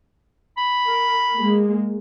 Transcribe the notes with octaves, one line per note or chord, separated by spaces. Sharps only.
B5
A#4
G#3 A#3